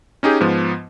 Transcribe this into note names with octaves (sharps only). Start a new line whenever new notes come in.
C#4 D#4 G4 G#4
G#2 F3 B3